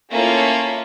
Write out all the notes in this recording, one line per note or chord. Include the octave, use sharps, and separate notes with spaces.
A3 A#3 C#4 E4 F4